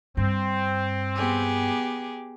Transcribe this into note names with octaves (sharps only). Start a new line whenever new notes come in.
G2 C4
B3 G4 G#4